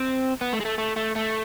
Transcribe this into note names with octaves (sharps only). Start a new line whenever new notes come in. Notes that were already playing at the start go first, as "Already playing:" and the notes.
Already playing: C4
B3
A3
G#3
A3
A3
A3
A3